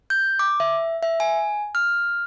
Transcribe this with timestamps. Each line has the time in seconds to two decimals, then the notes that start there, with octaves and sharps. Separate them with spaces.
0.10 G6
0.39 D6
0.60 E5
1.03 E5
1.20 G#5
1.75 F6